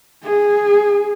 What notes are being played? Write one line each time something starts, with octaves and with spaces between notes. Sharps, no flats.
G#4